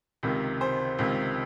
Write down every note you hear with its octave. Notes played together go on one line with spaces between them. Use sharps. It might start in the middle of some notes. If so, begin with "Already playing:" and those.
C#2 C3 D#3
C5
C#2 C3 D#3